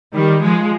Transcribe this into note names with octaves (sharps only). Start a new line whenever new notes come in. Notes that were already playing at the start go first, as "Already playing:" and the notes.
D#3 G3
F3 G#3